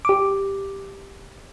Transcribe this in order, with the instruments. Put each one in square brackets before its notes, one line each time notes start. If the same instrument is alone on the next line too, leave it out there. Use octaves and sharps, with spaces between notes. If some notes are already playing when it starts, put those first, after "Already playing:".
[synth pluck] G4 D6